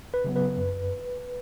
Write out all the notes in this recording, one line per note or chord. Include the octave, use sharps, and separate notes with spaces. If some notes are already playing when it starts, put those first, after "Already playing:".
B4
C#3 F#3 B3
B4
F#2